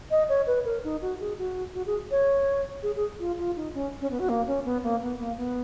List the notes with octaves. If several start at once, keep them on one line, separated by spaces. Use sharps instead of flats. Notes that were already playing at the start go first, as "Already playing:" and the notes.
D#5
C#5
B4
A#4
D#4
F#4
G#4
F#4
F#4
G#4
C#5
G#4
G#4
F4
F4
D#4
C#4
C#4
B3
F#4
A#3
C#4
B3
A#3
B3
A#3
B3